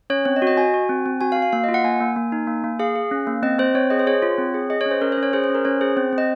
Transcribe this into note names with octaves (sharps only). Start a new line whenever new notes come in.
C#4 C#5
C4 C#5
D#5
F#4
D#5
F#4 G#5
F#4
C4
C4
F#4 G#5
F5
F#4
F5
A#3 F5
F4 D#5
F#5
A#3 G#5
A#3
A#3
D#4
A#3
A#3
G#4 F5
G#4
C#4
A#3
C4 D#5
C4 C5
C4 C#5
G#4 D#5
C5
G#4 C#5
F4
C4
G#4
G#4 D#5
C#5
C#4
C5
C#4 A#4
C5
C#4
C#5
G#4 C5
C5
C#4
A#4
C#4 C#5
G#4 C5
C4 C5
C4
D#5